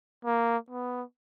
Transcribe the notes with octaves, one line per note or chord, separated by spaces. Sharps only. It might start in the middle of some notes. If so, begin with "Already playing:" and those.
A#3
B3